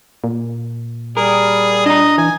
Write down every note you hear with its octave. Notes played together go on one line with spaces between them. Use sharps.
A#2
G3 G#4 A#4
D4 D#5 A#5
E3 G#5